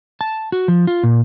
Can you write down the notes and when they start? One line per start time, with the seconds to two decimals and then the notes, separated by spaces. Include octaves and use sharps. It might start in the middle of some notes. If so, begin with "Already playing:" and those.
0.21 A5
0.52 F#4
0.68 F3
0.87 F4
1.03 A#2